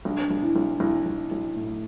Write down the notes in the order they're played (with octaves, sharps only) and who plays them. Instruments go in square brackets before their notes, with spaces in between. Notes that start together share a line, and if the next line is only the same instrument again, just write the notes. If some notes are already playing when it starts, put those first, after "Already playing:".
[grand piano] B1 [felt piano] D4
[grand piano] B1
[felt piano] E4
[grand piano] B1
[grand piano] B1 [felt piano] E4
[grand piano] B1
B1
A2